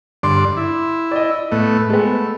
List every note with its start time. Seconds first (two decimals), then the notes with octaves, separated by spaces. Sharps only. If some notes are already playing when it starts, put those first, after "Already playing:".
0.23 G2 D3 D5 C6
0.57 E4
1.11 D5 D#5
1.52 A2 A3 B3
1.90 G#3 A3 B3